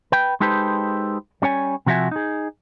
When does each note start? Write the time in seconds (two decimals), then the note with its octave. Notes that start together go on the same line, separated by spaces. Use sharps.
0.12 B4 G5
0.40 G#3 D#4 G4 A4 B4 C5
1.42 G3 C#4 C#5 G#5
1.86 C3 F3 F#4 G#4 E5 G#5
2.11 D#4 G#4